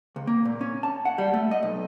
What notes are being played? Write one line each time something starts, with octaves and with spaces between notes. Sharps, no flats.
C#2
A#3
A#2
C#4
A5
F#5
G3
A3
D#5
B1